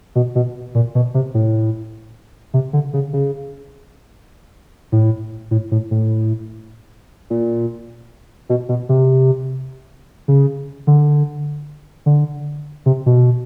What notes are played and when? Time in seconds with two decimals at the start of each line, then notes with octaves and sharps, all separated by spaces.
0.16 B2
0.35 B2
0.75 A#2
0.95 B2
1.14 C3
1.34 A2
2.54 C3
2.73 D3
2.94 C#3
3.13 C#3
4.92 A2
5.51 A2
5.71 A2
5.91 A2
7.30 A#2
8.49 B2
8.69 B2
8.89 C3
10.28 C#3
10.87 D3
12.06 D3
12.86 C3
13.06 B2